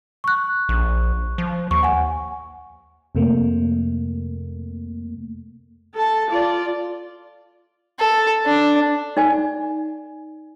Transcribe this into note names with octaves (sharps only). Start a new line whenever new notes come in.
C#6 F#6
A#1
F3
D#2 C#6
F#5 G#5
F2 C3 A3 A#3
A4 A5
F4 D5
A4
D4
D#4 D5 G#5